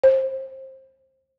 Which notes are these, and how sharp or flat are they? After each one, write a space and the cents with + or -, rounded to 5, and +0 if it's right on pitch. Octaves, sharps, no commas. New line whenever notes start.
C5 +25